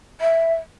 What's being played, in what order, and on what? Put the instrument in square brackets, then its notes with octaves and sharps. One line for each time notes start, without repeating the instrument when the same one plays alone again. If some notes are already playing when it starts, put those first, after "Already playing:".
[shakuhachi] E5